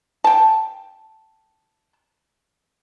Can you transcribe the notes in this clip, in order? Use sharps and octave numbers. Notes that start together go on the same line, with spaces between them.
G5 A5